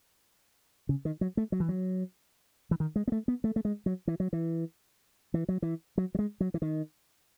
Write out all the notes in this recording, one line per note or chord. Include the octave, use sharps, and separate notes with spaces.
C#3
D#3
F#3
A3
F#3
E3
F#3
E3
D#3
G#3
B3
A3
B3
A3
A3
G#3
F#3
E3
F#3
E3
E3
F#3
E3
F#3
F#3
G#3
F#3
E3
D#3